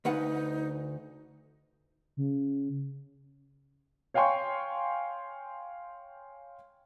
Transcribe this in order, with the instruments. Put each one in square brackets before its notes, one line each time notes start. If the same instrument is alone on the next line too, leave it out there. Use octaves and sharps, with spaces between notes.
[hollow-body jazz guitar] D2 B4 F#5 [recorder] D#4
[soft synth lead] C#3
[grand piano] C#5 F5 G5 G#5 C6 C#6